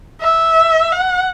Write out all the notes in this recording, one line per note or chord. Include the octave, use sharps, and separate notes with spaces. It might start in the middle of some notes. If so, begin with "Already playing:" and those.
E5
F#5